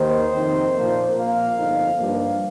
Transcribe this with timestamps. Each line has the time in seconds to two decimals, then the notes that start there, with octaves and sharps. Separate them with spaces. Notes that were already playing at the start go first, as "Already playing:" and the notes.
Already playing: D#2 D#3 C5
0.33 F2 C3 D#3 C4 D#4
0.75 A#2 F3 A#3
1.15 A#1 A#2 A#3 F5
1.56 G1 F2 F3 D#4
1.97 G2 F3 A#3